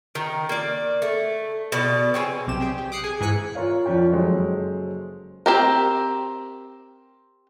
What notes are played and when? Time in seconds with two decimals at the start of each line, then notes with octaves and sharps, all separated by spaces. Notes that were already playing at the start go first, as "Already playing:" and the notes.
0.15 D#3
0.49 A#3 D5
1.02 A3
1.72 B2 D5
2.14 C4 C#4 G#4
2.47 B1 C3 G4 E7
2.60 G4 G#4 G5
2.78 G4
2.92 D6 D#6 F#6 C7 C#7
3.04 G#4 G#5
3.20 G#2 E3 G#5 F#6 B6 C#7
3.55 F4 A#4 C#5 F5
3.86 F2 F3 C#4 D5 G5
4.12 F#1 F#3 G#3 C#4 A4 C5
5.46 C4 G4 A#4